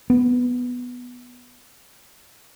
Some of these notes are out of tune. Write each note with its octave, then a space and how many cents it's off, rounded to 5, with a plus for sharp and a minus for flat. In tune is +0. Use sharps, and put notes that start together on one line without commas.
B3 +0